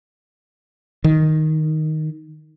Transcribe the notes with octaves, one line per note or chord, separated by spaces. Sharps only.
D#3